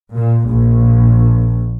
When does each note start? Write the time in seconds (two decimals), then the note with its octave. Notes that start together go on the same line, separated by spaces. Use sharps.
0.14 A#2
0.47 A#1